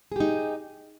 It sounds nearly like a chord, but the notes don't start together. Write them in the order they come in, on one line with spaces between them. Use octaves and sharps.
G#4 G4 D#4